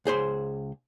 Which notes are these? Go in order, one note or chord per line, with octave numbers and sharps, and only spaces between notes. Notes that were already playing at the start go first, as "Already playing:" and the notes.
C#2 G#4 C5 C6